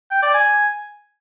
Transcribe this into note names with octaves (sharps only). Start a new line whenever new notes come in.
G5
D5
G#5